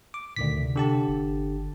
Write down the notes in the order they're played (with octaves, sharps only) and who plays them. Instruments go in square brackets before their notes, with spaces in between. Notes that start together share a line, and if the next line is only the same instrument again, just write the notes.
[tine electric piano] D6
[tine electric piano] D2 D#3 B6 [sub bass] A#2
[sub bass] C3
[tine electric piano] D3 G4 A5
[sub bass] G1